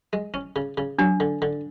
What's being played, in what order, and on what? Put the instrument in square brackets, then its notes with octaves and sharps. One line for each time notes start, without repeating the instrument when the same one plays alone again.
[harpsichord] G#3
C#4
C#3
C#3
[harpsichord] F#3 [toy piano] D4
[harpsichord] D3
D3